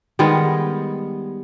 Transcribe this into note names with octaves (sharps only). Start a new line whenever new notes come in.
D#3 G3 G#3 B3